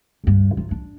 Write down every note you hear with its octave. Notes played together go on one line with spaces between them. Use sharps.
D2 G2
F#3 F4
D4